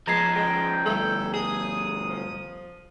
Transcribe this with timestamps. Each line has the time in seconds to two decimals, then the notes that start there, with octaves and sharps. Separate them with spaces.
0.07 F3 G#3 B3 A5 A#5 G#6 C7
0.35 G#3 G5
0.86 D2 G2 A4
1.34 G#4 D#6
2.10 F3